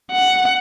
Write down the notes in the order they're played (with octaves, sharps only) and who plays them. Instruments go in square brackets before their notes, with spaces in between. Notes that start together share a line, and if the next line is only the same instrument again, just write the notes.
[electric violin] F#5